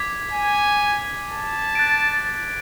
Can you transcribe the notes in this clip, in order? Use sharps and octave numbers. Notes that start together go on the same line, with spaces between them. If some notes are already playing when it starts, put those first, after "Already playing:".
Already playing: D6 G#6 B6
G#5
A5
F#6 A6 D7